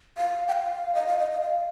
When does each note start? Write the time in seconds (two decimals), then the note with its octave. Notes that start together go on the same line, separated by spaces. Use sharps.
0.17 F5
0.48 G5
0.52 F5
0.95 D#5
1.07 F5
1.19 D#5
1.31 D#5
1.41 F5